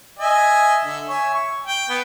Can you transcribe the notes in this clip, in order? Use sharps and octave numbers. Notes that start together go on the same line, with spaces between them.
D#5 E5 G#5
D3 E5
C#5 E5 G#5
C#6
G5
B3